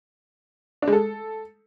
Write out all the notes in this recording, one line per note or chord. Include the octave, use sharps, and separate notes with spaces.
D4
G#3
A4